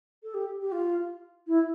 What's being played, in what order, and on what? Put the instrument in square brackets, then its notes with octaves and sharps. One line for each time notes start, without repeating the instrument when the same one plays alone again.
[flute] A4
G4
G4
F4
E4